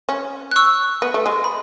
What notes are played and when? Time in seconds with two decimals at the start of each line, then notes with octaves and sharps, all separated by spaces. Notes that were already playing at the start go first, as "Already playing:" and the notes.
0.09 C#4
0.51 F#6
0.56 C#6 E6
1.02 B3
1.14 A3
1.26 G#3
1.44 B5